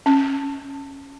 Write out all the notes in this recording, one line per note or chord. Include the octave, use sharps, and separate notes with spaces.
C#4